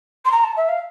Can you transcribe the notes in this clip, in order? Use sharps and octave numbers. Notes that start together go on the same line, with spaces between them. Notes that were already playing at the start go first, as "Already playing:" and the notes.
C6
A#5
A5
E5
F5